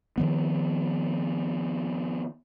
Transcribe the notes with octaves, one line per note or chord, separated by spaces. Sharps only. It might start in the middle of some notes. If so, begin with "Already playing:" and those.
D#3 F3 B3